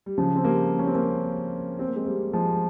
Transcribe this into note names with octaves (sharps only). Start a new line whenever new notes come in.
G3
C#3 F3
C4
G3 A#3
C#4
C4
A#3 C#4
C4
A#3
G#3 C4
G3 A#3
F3 G#3